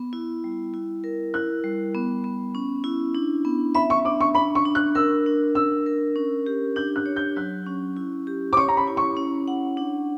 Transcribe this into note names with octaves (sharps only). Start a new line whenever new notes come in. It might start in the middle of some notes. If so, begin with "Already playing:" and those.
Already playing: B3
E4
G3
E4
A#4
E4 F#6
G3
B3
B3
C#4
E4
D4
B3
E5 B5
C#6
D4 D6
C#6
D4 B5
C#6
D4
F#6
A#4 E6
D4
A#4 E6
A#4
C#4
G4
D4 G6
F#6
C#5
G6
F#3 F#6
C#4
E4
G4
D6
C#5 C#6
A#5
B5
E4
C#6
C#4
F#5
D4